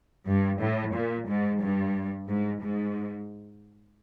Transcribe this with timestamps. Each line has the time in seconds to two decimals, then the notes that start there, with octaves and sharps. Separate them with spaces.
0.27 G2
0.61 A2
0.94 A#2
1.28 G#2
1.61 G2
2.28 G#2
2.62 G#2